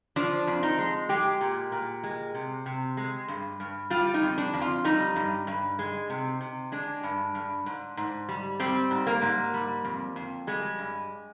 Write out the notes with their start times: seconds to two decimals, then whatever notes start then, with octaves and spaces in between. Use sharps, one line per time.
0.16 F3 D4
0.47 F2
0.63 D#4
0.79 G#3
1.09 G#3 G4
1.41 A#2
1.72 A#2
2.04 G#3
2.35 C3
2.66 C3
2.97 G#3
3.28 G2
3.60 G2
3.90 G3 F4
4.14 D#4
4.22 F2
4.38 D4
4.54 F2
4.61 F4
4.84 G3 D#4
5.16 G2
5.47 G2
5.79 G#3
6.10 C3
6.41 C3
6.72 G#3 D4
7.03 G2
7.35 G2
7.66 G#2
7.97 G#2
8.29 G3
8.60 G3 C4
8.91 G#2
9.07 A#3
9.22 G#2
9.54 G3
9.85 F2
10.16 F2
10.47 G3 G#3
10.79 G2